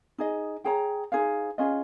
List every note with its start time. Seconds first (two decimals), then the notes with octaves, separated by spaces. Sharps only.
0.18 D#4 G#4 D#5
0.64 G#4 C#5 G5 A#5
1.12 D#4 G#4 C5 F5
1.58 C#4 F4 G#4 D#5